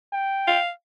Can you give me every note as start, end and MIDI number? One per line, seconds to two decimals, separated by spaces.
0.13 0.60 79
0.47 0.70 77